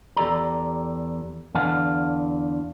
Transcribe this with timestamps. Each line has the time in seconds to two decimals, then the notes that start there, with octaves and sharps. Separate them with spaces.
0.17 E2 G4 A4 D5 A#5
1.55 E2 D3 E3 F5 F#5 A5